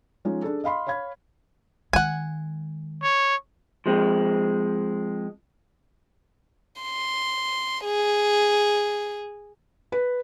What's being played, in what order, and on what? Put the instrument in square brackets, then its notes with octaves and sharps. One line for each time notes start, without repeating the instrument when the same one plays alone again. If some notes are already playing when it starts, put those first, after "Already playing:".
[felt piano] F3 G#3 C#4 D#4
D4 G#4 A4
D#5 F5 B5 C6
C#5 F5 B5 G#6
[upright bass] D#3 G#3 [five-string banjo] F#5 G#5
[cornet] C#5
[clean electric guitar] F3 G#3 C4
[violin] C6
G#4
[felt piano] B4